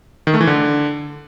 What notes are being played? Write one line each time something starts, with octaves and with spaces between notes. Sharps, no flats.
D#3
A3
E3
D3